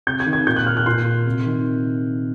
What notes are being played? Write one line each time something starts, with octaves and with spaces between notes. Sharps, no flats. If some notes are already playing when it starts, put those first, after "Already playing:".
C3 G6
G#6
D#3
G#6
A#2 G6
F#6
F6
F#6
A#2 C6
C3
D#3